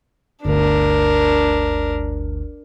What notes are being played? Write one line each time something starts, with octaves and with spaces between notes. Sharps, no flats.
G1 D2 D4 A#4